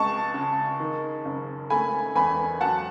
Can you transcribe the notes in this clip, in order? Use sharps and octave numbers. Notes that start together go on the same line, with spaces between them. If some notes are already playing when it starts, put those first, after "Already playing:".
Already playing: C#2 G#3 A5 C#6
C#3
D#3
F#1
A3 G#5 B5
E2 G#5 B5
F#3 F#5 A5